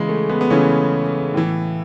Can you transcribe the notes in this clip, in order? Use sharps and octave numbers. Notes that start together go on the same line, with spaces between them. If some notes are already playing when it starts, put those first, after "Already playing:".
Already playing: C#3 E3 G#3
A3
G#3 B3
B3
C#3 E3 A3 C#4
A2 E3